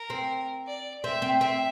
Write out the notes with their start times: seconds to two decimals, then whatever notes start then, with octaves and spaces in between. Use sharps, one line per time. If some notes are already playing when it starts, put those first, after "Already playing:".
Already playing: A#4
0.10 C4
0.66 D5
1.04 C4 E5
1.22 C4
1.41 C4 E5